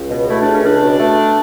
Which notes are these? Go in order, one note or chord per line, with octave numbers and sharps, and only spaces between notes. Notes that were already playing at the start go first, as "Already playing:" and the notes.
Already playing: C#2
B2
A3 E4
D4
C#2
C#4
C#2 D4
B2
A3